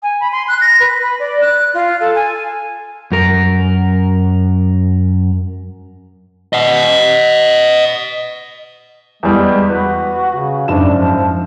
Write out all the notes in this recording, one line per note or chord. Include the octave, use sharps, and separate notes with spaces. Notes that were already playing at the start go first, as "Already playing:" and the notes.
G#5
B5
C6
F#6
A#6
B4
B5
D5
F#6
F4
A4
G#5
F#2 A#4
D#5 F#5
E2 G3 G#3
F#4 B4
C#3
F#1 G#2 D4 E7
F3